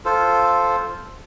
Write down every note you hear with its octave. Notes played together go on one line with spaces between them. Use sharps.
F4 A4 C5